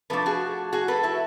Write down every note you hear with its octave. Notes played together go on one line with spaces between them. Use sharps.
D3 F3 A3 D4 A4 B4
F#4 G#4
F#4 G#4
A4 B4
E4 F#4